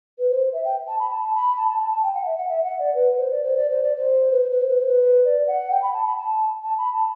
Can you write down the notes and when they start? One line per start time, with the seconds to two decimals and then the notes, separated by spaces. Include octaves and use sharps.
0.19 B4
0.30 C5
0.53 E5
0.65 G5
0.88 A5
0.99 B5
1.11 A5
1.34 B5
1.57 A5
1.68 A5
1.80 A5
1.91 A5
2.03 G5
2.14 F#5
2.26 E5
2.37 F#5
2.49 E5
2.64 F#5
2.79 D5
2.95 B4
3.18 C5
3.31 D5
3.43 C5
3.56 D5
3.70 C5
3.83 D5
3.96 C5
4.32 B4
4.41 C5
4.51 B4
4.60 C5
4.69 B4
4.78 C5
4.87 B4
5.25 D5
5.47 F#5
5.71 G5
5.82 B5
5.93 A5
6.05 B5
6.16 A5
6.63 A5
6.78 B5
6.93 A5